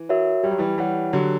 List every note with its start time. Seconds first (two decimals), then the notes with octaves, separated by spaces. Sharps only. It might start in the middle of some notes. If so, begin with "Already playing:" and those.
Already playing: E3
0.09 F#4 A#4 C#5 E5
0.43 G3 G4
0.51 F#3
0.58 E3 G3
0.78 E3 G3 C#5 F#5
1.13 D3 F#3 G4